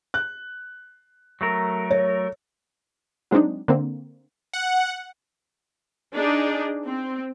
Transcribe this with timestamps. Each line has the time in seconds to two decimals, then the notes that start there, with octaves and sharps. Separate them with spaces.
0.14 F#6
1.41 F#3 A3 A#4
1.91 C#5
3.31 F#3 G#3 C4 D4 D#4
3.68 D3 A#3 C4
4.53 F#5
6.13 D4 D#4 G#4
6.85 C4